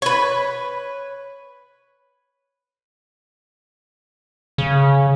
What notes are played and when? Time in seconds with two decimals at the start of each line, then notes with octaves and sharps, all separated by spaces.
0.02 B4 C#5
4.58 C#3